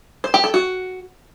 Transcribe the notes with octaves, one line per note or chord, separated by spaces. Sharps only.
C5
G4
A4
F#4